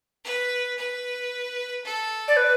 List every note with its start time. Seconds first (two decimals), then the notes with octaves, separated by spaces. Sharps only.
0.24 B4
0.78 B4
1.84 A4
2.28 D5
2.37 B4